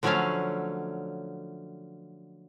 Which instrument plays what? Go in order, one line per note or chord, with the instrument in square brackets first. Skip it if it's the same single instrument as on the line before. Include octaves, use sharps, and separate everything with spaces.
[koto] D3 F3 F#3 A3 C#4 F5